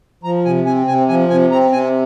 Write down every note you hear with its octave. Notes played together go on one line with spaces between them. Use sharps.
F3 A#5
C3 G#5
C4 G#5
C3 G#5
F3 G#5
C3 G#5
C4 A#5
C3 G#5